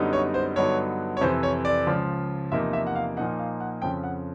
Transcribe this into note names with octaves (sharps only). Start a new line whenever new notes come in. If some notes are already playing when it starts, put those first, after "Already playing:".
Already playing: F#2 D3 G3 B3 D#4
C#5
C5
G2 D3 F#3 B3 D#4 C#5
C#5
F2 C3 E3 C5
C#5
D5
C#2 C#3 F3
E2 C3 F3 A#3 D#4 E5
E5
F#5
F5
A#2 F3 A#3 D#4 F#5
F5
F#5
F2 C#3 F3 G5
F#5